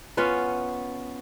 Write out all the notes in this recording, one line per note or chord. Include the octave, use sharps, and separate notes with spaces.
B3 C#4 F4 B4